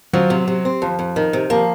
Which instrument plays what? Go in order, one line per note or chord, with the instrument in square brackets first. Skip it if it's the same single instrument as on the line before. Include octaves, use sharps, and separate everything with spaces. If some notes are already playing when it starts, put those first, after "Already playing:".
[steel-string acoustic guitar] F3 [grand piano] F#3
[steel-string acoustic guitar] C3
C3
C4
[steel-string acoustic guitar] F2 [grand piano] F3
[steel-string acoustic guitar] F2
D#3
C3
[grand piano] F3 [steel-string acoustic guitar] A#3